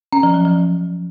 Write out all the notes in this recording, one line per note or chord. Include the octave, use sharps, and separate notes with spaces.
C#4
F3
F#3
F3